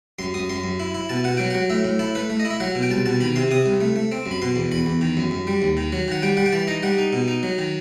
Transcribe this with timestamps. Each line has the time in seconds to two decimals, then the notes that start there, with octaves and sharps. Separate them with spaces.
0.19 F#2 C6
0.34 F#2 D#6
0.49 F#2 C6
0.64 F#2
0.80 E4
0.94 E4
1.09 B2 A5
1.24 B2 F#5
1.37 F#3 G5
1.50 F#5
1.55 F#3
1.70 A2 E5
1.85 A2
1.99 E4 A4
2.15 A3 B4
2.30 A3
2.40 D#5
2.45 E4
2.50 E5
2.60 F#3 F#5
2.75 B2
2.82 G5
2.90 C2 A5
3.06 B2 A5
3.21 D#3 B5
3.36 C3 C6
3.51 C3 D#6
3.66 C2
3.81 A3
3.96 A3
4.12 C4
4.26 F#2
4.31 B5
4.42 B2 C6
4.56 E2
4.72 E2 B5
4.86 E2
5.01 D#3
5.17 F#2
5.31 F#2
5.47 G3
5.62 D#2
5.77 D#3
5.92 F#3
6.08 D#3 F#5
6.22 G3 G5
6.37 G3 F#5
6.46 G5
6.52 E3 A5
6.67 D#4 D#5
6.83 G3 F#5
6.98 D#4
7.13 B2
7.28 D#4
7.43 F#3
7.58 D#3